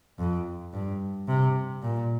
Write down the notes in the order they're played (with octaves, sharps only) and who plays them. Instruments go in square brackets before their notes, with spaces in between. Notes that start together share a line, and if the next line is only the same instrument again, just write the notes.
[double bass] F2
G2
C3
A#2